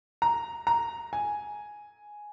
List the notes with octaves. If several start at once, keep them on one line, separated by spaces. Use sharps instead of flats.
A#5
A#5
G#5